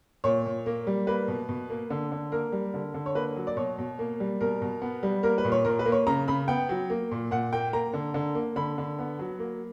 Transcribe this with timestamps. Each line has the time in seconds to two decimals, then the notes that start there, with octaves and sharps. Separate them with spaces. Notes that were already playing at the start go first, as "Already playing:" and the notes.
0.24 A#2 C#5
0.45 A#2
0.66 A#3
0.87 G3
1.07 A#3 B4
1.28 B2
1.49 B2
1.70 A#3
1.90 D3
2.12 D3
2.32 A#3 A#4
2.52 G3
2.74 D3
2.94 D3
3.06 C#5
3.15 A#3 B4
3.36 F#3
3.47 D5
3.57 B2 C#5
3.78 B2
3.99 A#3
4.20 G3
4.41 B2 A#4
4.62 B2
4.82 B3
5.03 G3
5.23 A#3 A#4
5.38 B4
5.44 A#2
5.52 C#5
5.64 A#2 A#4
5.79 B4
5.86 A#3
5.92 C#5
6.07 C#3 A#5
6.28 C#3 B5
6.48 B3 G5
6.69 F#3
6.90 A#3
7.11 A#2
7.31 A#2 F#5
7.53 A#3 G5
7.73 A#3 A#5
7.93 D3
8.14 D3
8.35 A#3
8.56 D3 B5
8.78 D3
8.98 B3
9.19 F#3
9.39 A#3